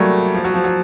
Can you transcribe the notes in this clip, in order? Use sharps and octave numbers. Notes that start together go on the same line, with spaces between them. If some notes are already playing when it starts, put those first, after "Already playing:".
Already playing: F#3 G3 A3 A#3
F3
F#3
F3
F#3